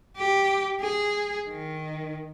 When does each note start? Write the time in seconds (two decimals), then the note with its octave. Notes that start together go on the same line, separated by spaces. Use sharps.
0.17 G4
0.81 G#4
1.48 D#3